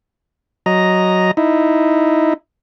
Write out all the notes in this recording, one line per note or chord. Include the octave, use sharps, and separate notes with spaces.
F#3 D#5 A#5
D#4 E4